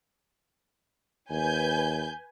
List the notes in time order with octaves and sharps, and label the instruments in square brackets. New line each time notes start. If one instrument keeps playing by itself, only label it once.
[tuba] D#2 [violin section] B4 G#5 G6